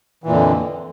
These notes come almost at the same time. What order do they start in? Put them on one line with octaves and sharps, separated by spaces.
E3 A#2 F2 D3